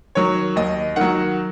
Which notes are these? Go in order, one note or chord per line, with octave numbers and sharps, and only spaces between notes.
D#3 F#3 C#5
D#2 D#5
D#3 F#3 F#5